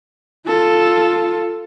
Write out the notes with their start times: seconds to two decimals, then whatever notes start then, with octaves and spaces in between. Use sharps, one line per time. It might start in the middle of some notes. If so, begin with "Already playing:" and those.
0.47 F4 A4